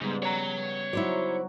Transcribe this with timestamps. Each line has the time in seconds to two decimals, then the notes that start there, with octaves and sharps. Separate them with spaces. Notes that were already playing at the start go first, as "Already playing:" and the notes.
0.01 G#2 C#3 G3 B3
0.23 C#5 A#5
0.93 F#3 D#4 E4 F#4 C5 D5